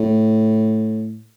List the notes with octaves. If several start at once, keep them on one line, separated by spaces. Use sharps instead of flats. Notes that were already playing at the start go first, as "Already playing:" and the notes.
Already playing: A2